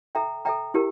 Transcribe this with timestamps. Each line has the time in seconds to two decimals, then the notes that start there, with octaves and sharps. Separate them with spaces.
0.15 A4 E5 G5 A#5
0.45 A4 E5 G5 A#5
0.74 E4 G4 A#4